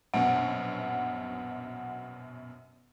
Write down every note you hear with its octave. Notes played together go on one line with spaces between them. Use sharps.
A#1 F#2 B2 F#5